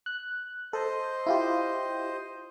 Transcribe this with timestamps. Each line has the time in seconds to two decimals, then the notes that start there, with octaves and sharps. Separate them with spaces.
0.06 F#6
0.73 A4 C5 D#5
1.26 E4 F4 G4